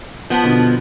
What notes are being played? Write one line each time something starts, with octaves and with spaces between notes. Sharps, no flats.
F3 B3
B2 D3